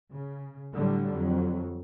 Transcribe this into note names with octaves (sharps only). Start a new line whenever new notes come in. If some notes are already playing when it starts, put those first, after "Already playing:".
C#3
A2 D3 F#3 G3
F2 F#3